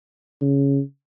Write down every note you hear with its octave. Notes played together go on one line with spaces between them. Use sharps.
C#3